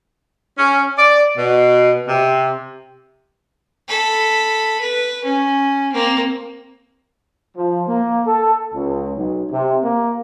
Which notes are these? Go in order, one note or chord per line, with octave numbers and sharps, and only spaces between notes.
C#4
D5
B2
C3
A4 B5
B4
C#4
A#3 C4
F3
A#3
A4
C#2
B1
C3
A#3